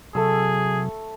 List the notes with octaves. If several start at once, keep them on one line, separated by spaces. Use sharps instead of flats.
C3 F#3 A3 G#4 A4 E6